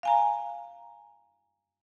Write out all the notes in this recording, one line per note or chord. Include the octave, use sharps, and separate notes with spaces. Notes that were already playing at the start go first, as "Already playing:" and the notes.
F5 G#5 A#5